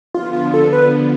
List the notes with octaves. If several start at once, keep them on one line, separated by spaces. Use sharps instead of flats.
D3 F3 B3 F4
F4
A4
B4